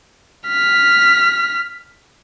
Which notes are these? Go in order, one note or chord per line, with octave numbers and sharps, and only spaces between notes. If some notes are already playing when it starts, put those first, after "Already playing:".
F6 B6